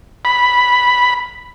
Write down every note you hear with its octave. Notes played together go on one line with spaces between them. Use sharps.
B5